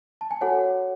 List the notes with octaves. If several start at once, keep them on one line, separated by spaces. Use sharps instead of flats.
A5
G#5
F#4 A4 C#5 F#5